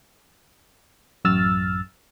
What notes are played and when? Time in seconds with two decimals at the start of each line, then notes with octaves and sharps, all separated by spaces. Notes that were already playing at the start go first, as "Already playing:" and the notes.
1.25 A1 F#2 E6 F6 A6